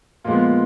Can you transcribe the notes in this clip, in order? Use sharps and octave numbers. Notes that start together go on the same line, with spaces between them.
A#2 F3 G#3 B3 F4